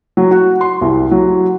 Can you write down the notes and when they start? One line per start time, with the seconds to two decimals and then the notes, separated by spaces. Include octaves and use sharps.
0.17 F#3
0.31 F#4
0.61 C6
0.82 C2
1.11 F#3